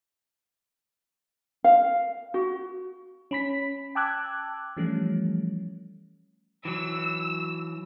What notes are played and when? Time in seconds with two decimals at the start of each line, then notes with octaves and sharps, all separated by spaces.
1.64 F5
2.34 F#4
3.31 C#4 B5 B6
3.95 G5 A5 D6 E6 F#6 G#6
4.77 E3 F3 G3 A3 C#4
6.65 E3 F#3 E6